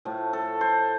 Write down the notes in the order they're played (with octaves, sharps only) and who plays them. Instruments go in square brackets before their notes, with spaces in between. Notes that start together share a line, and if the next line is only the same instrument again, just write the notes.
[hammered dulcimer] A2 F3 A3
A4
C5